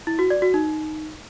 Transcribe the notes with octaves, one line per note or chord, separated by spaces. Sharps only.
E4
F#4
D5
F#4
D#4